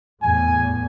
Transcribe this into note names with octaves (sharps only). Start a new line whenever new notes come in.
E2 A2 G#5